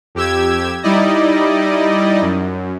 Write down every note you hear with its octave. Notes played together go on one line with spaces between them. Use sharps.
F2 G4 E6 G#6
G3 D#4 E4 D5 D#5
F#2